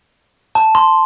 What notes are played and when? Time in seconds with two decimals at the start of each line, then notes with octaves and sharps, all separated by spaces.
0.55 A5
0.75 C6